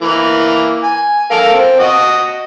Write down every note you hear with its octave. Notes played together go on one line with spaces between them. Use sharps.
E3 A#3
G#5
A4 A#4 F5
C4
F#4 D#5